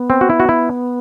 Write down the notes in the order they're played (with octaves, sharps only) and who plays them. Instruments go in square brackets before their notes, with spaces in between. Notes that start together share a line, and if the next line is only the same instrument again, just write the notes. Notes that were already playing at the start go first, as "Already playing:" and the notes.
Already playing: [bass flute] B3
[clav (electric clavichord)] C4
F#4
E4
F#4
E4